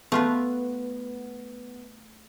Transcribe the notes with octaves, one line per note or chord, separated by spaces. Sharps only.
A3 B3 F4 B4